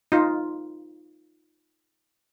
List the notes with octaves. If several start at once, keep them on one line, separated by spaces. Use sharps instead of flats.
D#4 F4